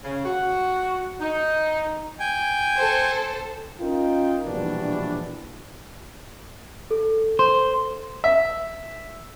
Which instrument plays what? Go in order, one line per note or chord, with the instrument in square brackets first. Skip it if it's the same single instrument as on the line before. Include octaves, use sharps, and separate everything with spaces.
[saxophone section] C#3
F#4
D#4
[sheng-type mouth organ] G5 G#5
[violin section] A4 C5
[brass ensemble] C#4 D#4 F4 A#4 G5
A#1 G2 B2 E3 D4
[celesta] A4
[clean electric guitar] C5
[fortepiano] E5